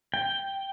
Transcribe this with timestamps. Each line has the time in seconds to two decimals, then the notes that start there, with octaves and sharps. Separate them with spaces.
0.14 G5